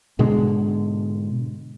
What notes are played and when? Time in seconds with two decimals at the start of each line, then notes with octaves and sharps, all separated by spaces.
0.19 G#2 B2 D3 G#3